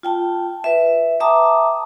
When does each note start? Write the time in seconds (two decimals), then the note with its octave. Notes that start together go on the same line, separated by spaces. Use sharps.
0.03 F4 G5 A5
0.64 B4 E5
1.20 E5 G5 A5 A#5 D6 D#6